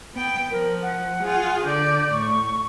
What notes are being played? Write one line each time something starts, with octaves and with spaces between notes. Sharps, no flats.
B3 G5
F3 A#4
F#5
F4 G#4
D3 D5 G6
A2 C#6